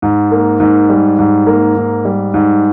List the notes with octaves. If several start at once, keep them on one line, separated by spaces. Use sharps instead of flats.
G#2
A#3
G#2
G3
G#2
A#3
G#2
G3
G#2